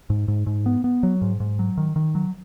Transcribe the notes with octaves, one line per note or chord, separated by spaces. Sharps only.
G#2
G#2
G#2
B3
B3
F#3
G#2
G#2
F#3
D#3
D#3
F#3